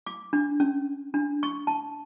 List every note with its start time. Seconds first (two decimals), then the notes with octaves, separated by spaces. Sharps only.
0.07 D6
0.33 D4
0.60 C#4
1.14 D4
1.43 C#6
1.67 A5